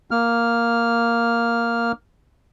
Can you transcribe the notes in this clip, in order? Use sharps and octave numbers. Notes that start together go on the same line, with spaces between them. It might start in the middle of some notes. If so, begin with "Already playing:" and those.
A#3 F6